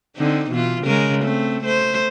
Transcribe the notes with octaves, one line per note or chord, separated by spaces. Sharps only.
D3 C4 D#4
B2 E3 F4
C#3 G#3 A#4
A3 C4
A3 C5